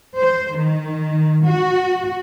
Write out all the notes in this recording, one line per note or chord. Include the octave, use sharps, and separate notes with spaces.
C5
D#3
F#4